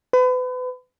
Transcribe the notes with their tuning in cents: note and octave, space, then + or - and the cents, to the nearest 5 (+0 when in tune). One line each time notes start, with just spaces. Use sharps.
B4 +35